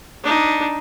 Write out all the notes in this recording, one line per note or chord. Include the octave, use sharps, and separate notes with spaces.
D4 D#4